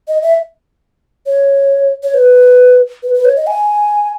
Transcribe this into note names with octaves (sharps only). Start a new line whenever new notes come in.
D#5
E5
C#5
C#5
B4
B4
B4
C#5
D#5
G#5